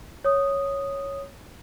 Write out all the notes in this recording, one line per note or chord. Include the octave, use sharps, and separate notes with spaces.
C#5 D#6